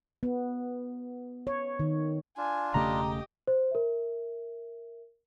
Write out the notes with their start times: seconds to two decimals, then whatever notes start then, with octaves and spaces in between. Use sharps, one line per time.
0.23 B3
1.47 C#5
1.79 D#3
2.37 D4 F4 G#5
2.74 E1 C#3 A3 G4 D#5 A#5
3.48 C5
3.71 A#4 E5